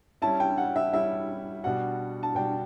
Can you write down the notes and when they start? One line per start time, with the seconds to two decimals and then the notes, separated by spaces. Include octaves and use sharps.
0.22 G3 C#4 E4 A5
0.40 G5
0.58 F#5
0.76 E5
0.93 G3 C#4 E4 E5
1.64 B2 G3 D4 F#4 F#5
2.23 A5
2.35 B2 G3 D4 F#4 G5